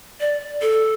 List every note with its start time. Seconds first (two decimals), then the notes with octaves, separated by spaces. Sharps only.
0.20 D5
0.62 A4